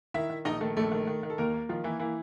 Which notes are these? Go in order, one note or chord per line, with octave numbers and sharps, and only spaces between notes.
D#3 E4 E5
D#3
A#1 D#4 D#5
D#3 A3 A4
A#1 A3 A4
D#3
D#3
D#3
A4
D#2 A#3 A#4
A#3
D#3 F3 F4
E3 A#3 E4
E3 A#3 E4